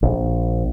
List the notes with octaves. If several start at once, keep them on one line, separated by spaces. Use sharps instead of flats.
A#1